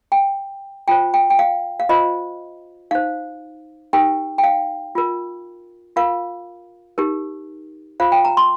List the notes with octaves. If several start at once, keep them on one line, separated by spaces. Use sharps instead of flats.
G5
F4 C5 G5
G5
G5
F5
F5
F4 C5 D#5
D#4 C5 F5
D#4 G4 A#4 G5
G5
F5
F4 A#4
F4 A#4 F5
D#4 G4 A#4
F4 C5 F5
G5
A#5
C6